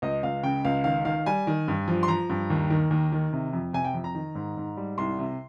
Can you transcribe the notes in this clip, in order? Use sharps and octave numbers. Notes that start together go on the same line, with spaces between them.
C#2 D#5
C#2 F5
C#3 G5
C#2 F5
D#3 F5
D#3 F5
G3 G#5
D#3
G2
F3
C6
F3 A#5
G2
D#2
D#3
D#2
D#3
C3
F2
C3 G#5
G5
F2
A#5
D#3
G#2
G#2
G3
C2 C6
C3